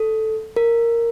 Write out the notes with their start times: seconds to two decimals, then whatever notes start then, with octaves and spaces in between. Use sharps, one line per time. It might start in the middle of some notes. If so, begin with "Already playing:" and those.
Already playing: A4
0.56 A#4